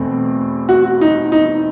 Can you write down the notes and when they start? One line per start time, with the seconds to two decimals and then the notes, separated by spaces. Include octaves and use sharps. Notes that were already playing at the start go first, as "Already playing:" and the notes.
Already playing: E2 B2 A3 C4
0.69 F#4
1.01 D#4
1.32 D#4